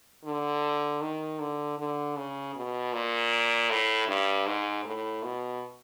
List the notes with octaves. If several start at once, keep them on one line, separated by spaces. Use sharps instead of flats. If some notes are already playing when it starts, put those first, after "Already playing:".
D3
D#3
D3
D3
C#3
B2
A#2
A2
G2
G#2
A2
B2